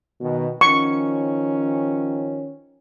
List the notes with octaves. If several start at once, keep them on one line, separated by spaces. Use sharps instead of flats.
B2 D#3
D#3 F3 C#4 C#6